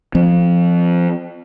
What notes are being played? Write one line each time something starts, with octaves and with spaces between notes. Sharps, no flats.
F3 C4